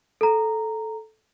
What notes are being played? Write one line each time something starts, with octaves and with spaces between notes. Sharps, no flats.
A4 A#5